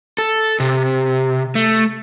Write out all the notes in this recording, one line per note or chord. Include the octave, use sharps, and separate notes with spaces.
A4
C3
A3